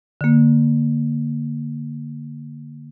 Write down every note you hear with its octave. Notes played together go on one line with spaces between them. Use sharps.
D3 A#3